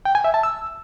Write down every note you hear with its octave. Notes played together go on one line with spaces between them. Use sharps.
G5
G#5
E5
A5
E6